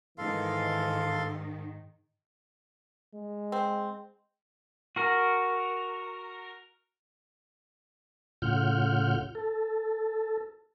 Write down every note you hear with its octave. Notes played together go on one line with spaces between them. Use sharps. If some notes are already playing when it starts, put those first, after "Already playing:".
G#2 D#3 E3 G#3 A4 F5 C6
G#3
C4
F#4 A#4
A2 C#3 F4 F#5 F6 G6
A4